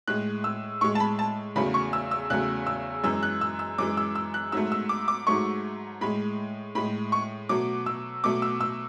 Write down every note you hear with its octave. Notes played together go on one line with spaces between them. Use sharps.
A2 G#3 F#6
E6
A2 G#3 C#6
A5
B5
A5
E2 C#3 F#3 A3 B5
C#6
E6
E6
E2 C#3 F#3 A3 F#6
E6
F#2 E3 G#3 E6
F#6
E6
E6
F#2 E3 G#3 D6
E6
E6
F#6
G#2 F#3 A3 E6
E6
D6
D6
G#2 F#3 A3 C#6
A2 G#3 B5
A2 G#3 B5
C#6
B2 F#3 A3 D6
E6
B2 F#3 A3 D6
E6
E6